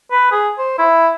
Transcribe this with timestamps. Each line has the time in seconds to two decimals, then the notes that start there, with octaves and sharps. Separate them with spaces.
0.11 B4
0.32 G#4
0.58 C5
0.79 E4